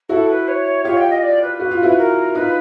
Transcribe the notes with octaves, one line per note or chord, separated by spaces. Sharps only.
E4 F#4 A4
B4
C#5
F4 G4 C#5
G5
D#5
D5
B4
F#4
F4
E4 F#4
A#4
D#4 F4 B4